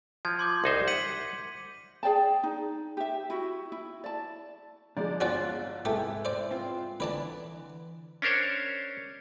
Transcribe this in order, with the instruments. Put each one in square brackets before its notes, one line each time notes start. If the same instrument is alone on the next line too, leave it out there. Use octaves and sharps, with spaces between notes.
[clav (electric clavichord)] F3 [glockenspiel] G#6
[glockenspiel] C6 D6 G6
[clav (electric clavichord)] C2 D#4 C5
[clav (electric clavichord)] F#5 [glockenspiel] B6 D#7
[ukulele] G#4 D5 G5 A5
D#4
G4 E5
E4 F#4
E4
D5 A5
[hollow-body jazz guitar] D3 F3 D4 [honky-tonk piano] G#3 D5
[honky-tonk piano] G1 F#6 A6 [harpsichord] C#4 F#4 D5 [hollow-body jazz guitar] C5
[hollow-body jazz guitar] G#2 C3 [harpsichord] A3 G4 [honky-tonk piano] E4 G#4 B4
[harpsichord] C5 D5
[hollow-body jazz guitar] C4 F4
[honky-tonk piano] D3 [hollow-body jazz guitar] E3 [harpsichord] B4 D5 A5
[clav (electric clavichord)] C#4 D4 A#4 C5 C#5